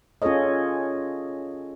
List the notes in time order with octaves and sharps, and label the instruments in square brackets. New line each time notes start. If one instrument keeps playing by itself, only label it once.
[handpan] C#4 F4 G#4 A4 C#5 D#5